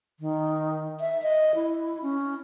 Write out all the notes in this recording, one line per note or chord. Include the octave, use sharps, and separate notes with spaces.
D#3
E5
D#5
E4
C#4